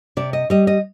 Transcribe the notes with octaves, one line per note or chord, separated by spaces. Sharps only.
C3 D5
D#5
G3 D#5
D#5